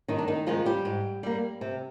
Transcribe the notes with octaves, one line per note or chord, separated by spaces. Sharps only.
G2 D#3 D#4
D4
D#3 D#4
D#3 F3 G#3 F4
G3 G4
G#2
G3 A#3
C3